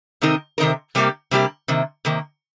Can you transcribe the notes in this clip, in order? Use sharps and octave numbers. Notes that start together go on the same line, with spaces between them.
C3 D#3 C4 D#4 A#4
C3 D#3 C4 D#4 A#4
C3 G3 A#3 G4
C3 G3 A#3 G4
C3 D#3 A#3
C3 D#3 A#3